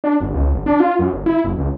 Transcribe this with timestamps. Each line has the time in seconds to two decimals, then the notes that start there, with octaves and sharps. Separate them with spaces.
0.04 D4
0.21 G1
0.33 C#2
0.54 G1
0.66 D4
0.80 F4
0.99 F#2
1.13 G1
1.26 E4
1.45 F#1
1.58 C#2